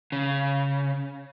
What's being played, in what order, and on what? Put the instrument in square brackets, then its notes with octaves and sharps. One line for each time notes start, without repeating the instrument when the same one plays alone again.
[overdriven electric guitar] C#3